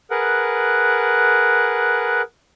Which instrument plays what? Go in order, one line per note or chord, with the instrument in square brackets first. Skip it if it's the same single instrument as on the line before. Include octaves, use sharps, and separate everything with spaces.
[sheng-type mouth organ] G#4 A#4 B4 F#5